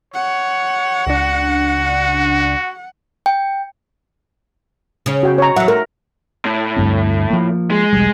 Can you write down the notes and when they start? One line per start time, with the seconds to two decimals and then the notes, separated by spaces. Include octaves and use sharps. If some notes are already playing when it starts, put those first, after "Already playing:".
0.14 C#5 F#5
1.07 C#2 D4 F#4
3.26 G5
5.06 C#3 C#4
5.23 F#4 G5
5.38 C#5 A#5
5.56 E2 F#3 E5 F#5
5.68 A3 A#4
6.45 A2
6.77 D2 G2 C4
7.30 F3 A#3
7.71 G#3
7.93 E1 B1 G3